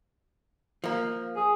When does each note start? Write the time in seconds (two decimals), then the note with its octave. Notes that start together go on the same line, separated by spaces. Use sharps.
0.84 F3 A#3
1.36 G#4